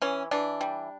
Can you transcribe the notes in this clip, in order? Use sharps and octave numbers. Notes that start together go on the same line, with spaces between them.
E3 C#4
E3 D4
G3